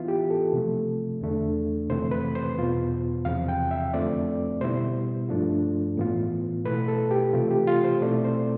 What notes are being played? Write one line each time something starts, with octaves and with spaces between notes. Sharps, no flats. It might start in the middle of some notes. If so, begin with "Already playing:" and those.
Already playing: E3 B3 E4 F4
G4
A4
C3 F3 A3
E2 D3 A3 D4
F2 C3 E3 A3 C4 C5
B4
C5
E2 B2 B3 F4
E2 C3 F3 C4 F5
G5
E5
F2 D3 F3 A3 C4 D5
B2 G3 B3 E4 C5
G2 F3 A3 D4 F4
A2 E3 B3 F4
B2 A3 E4 B4
A4
G4
C3 E3 A3 F4
G4
F4
C5
B2 A3 C4 E4 D5
C5